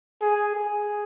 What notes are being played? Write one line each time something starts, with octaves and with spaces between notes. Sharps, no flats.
G#4
G#4